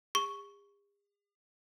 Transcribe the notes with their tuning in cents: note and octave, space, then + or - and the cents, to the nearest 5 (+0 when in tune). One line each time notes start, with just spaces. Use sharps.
G#4 -45 C#6 +0